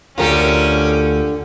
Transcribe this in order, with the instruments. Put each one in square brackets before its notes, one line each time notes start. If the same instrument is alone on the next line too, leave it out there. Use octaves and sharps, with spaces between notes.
[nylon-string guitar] D2 A#4 [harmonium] D3 [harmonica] C#4 [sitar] F4 G4 A4